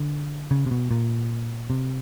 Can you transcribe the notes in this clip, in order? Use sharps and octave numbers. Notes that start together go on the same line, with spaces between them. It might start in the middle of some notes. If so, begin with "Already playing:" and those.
Already playing: D3
C#3
C3
B2
A#2
C3